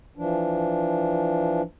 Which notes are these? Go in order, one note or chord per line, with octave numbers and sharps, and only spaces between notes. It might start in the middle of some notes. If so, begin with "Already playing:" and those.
E3 F3 D4